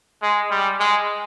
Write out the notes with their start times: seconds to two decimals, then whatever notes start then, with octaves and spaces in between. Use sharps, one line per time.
0.22 G#3
0.51 G3
0.80 G#3